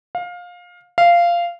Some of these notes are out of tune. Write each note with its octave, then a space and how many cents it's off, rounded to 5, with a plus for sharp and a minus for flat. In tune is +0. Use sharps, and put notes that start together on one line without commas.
F5 +20
F5 -15